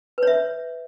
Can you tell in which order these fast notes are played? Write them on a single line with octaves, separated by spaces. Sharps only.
B4 C#5 E5